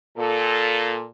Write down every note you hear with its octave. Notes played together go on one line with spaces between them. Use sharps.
A#2 A4